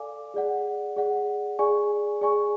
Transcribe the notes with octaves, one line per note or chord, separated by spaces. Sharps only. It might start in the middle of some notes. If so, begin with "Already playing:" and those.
Already playing: A4 D5 F5 G#5 D6
G#4 D5 F#5
G#4 D5 F#5
G#4 D5 G#5 C#6
G#4 D5 G#5 C#6